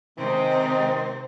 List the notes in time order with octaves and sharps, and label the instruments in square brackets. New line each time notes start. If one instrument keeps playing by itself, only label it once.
[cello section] C3 [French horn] D#3 [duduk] G#3 [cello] C4